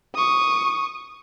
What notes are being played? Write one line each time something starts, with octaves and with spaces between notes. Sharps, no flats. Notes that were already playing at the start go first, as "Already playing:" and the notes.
C#6 D#6